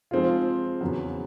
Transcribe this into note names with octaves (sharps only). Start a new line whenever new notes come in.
F3 G#3 C4 F4
E2 C#3 F#3 B3